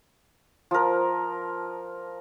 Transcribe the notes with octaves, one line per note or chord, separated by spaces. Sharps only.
F3 A#4